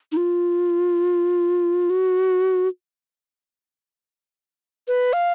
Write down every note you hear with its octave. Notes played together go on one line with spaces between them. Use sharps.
D#4
F4
F#4
B4
F5